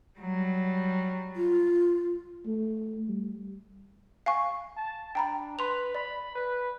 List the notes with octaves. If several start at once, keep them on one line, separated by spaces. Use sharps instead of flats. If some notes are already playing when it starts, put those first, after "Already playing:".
F#3 G3
F4
A3
G3
F5 G#5 C#6
A5
D4 G5 A#5 B5
B4 C6 F7
D5 B5
B4